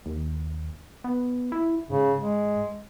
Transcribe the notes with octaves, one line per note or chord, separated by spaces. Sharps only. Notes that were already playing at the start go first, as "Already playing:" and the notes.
D#2
B3
E4
G#2 C#3
G#3